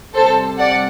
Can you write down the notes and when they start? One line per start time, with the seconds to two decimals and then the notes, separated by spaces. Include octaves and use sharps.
0.14 C3 G3 A4 C5
0.59 D5 F#5